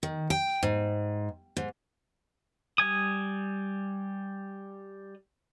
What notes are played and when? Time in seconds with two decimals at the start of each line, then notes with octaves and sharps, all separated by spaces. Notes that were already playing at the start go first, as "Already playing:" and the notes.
0.03 D#3
0.30 G5
0.63 G#2
1.57 G#2
2.78 G3 G#5 D#6